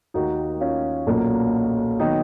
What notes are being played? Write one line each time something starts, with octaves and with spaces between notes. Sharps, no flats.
D#2 D#3 A#3 D#4 F#4
C#4 F4
B1 A#2 F#3 A#3
D#3 F#3 B3 D#4